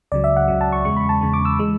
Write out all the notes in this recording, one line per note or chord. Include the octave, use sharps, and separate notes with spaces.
C#2 C#3 F#3 D5
E5
F#5
C#2 C#3 F#3
A5
C#6
E2 C#3 G#3 C#6
B5
A5
E2 C#3 G#3
D6
E6
E3 G#3